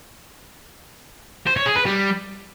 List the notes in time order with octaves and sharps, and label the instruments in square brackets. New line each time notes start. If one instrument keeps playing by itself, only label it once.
[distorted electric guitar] C5
C#5
G#4
B4
G3